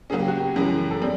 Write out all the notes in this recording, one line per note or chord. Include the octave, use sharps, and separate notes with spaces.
C#3 F#3 A#3 C#4 G#4
G4
F#4
G4
F#2 C#3 E3 G#3
A4
G3 C4 G#4